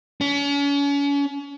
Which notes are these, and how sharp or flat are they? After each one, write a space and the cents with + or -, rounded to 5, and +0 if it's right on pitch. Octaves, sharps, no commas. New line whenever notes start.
C#4 +40